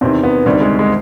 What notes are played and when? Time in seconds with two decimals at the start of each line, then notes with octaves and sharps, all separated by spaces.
0.01 E2 C3 D#3 C4
0.23 B3
0.45 D2 C3 D#3 G3
0.61 G#3
0.79 G#3